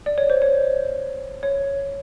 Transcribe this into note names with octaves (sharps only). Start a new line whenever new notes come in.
D5
C#5
C5
C#5
C#5